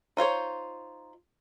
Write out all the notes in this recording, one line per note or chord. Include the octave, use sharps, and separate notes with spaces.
D#4 F4 C5 C#5